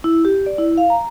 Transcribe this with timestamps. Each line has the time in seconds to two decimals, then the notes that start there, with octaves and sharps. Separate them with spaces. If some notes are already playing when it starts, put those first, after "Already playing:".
0.04 E4
0.25 G4
0.46 D5
0.58 E4
0.78 F5
0.90 A#5